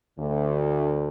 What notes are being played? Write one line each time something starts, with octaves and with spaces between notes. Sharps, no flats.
D2 D3